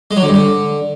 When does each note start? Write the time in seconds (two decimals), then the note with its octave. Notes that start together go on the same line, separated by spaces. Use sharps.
0.11 G#3
0.17 F#3
0.22 D3
0.28 G2
0.34 D3